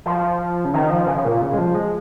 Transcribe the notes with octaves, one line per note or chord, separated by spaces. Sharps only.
F3
C#3
D#3
F3
C#3
A#2
C#3
G#3
F3
G#3